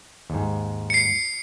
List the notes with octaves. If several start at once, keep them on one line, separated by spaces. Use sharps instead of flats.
D#2 G#2
C7 C#7